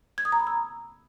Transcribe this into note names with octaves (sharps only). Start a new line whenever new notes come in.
G#6
D#6
A#5
B5
E6